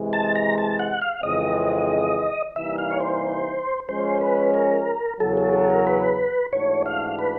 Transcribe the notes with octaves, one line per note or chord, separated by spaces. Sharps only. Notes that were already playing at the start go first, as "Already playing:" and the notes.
Already playing: C3 E3 G#3
A5
A#5
A5
F#5
F5
F2 C#3 E3 G#3 C4 D#5
C3 E3 G3 A#3 D#4 E5
F5
C#5
C5
F3 G#3 C#4 C5
B4
A#4
E2 C#3 F#3 A4
A4
A4
A#4
B4
G#2 E3 A3 D4 F#4 C#5
F5
B4